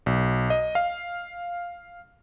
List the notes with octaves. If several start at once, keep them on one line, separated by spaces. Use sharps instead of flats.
B1
D#5
F5